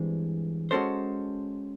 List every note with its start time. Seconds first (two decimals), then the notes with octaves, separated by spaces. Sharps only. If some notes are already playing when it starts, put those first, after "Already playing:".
Already playing: G2 E3 G#3 C4
0.71 G#3 C#4 F#4 A4 C5